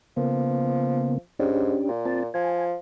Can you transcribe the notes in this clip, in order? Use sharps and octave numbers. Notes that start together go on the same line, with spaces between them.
C#3 F3 A#3 B3
G#2 C#4 D4 G4
A#2
C4 F4 A5
F3 G#5